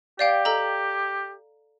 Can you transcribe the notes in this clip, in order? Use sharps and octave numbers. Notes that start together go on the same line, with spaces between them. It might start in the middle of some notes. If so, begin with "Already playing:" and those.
G4 D5 F5 G5
A4 D#5 A#5